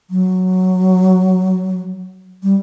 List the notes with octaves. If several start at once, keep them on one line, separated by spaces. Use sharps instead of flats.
F#3
G3